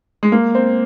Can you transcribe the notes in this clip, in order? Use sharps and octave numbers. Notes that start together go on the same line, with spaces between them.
G#3
A#3
C4